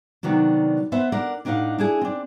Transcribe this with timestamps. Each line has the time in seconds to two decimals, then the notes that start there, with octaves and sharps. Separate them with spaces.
0.23 C3 D#3 F#3 B3 D4
0.92 B3 B4 C5 E5
1.12 D4 A#4 F#5
1.45 A2 D4 D#4 C#5 F5 F#5
1.78 D4 E4 G#4 G#5
2.01 C4 D4